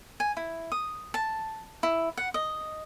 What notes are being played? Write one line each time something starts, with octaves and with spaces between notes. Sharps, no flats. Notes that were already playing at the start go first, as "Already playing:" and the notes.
G#5
E4
D#6
A5
E4
F#5
D#5